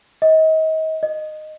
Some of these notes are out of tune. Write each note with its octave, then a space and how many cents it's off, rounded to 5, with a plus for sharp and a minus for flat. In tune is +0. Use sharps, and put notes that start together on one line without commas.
D#5 +35
D#5 -15